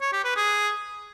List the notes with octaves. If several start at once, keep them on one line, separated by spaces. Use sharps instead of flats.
C#5
G4
B4
G#4